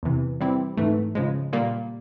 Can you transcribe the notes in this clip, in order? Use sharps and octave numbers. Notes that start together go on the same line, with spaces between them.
E2 C3 E3
E3 G3 C4 E4 G4
G#2 E3 A3
C#3 F3 G#3
A#2 G3 A#3